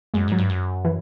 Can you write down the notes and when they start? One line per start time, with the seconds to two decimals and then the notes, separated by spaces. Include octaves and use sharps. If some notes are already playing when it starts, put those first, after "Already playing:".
0.14 F#2 G#3
0.28 G#2 F#3
0.38 G2
0.49 F#2
0.85 E3